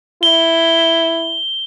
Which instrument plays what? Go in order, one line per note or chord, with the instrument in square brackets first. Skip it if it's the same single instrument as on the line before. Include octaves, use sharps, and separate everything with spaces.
[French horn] E4 [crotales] G7